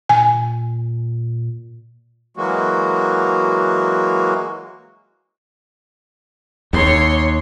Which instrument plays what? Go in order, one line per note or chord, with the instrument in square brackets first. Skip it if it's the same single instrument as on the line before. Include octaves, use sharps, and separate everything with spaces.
[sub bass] A#2 [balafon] G#5
[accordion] E3 F#3 G#3 A#3 F#4
[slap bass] D#2 [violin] C#5 C6